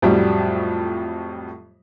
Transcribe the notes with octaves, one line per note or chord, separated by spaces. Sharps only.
F2 A2 F#3 G3